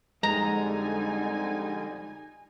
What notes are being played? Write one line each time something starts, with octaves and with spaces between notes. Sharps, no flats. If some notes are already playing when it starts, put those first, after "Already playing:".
F2 D3 G3 G#3 D#4 G#5 A#5